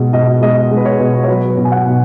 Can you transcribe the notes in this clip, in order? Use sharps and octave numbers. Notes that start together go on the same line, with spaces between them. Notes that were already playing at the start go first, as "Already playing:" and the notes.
Already playing: B2 G#3
B2 D#5
G#3 D#5
G#3
B4
C#5
B2
C#5
F#3 B4
B2
G#5
F#5
B2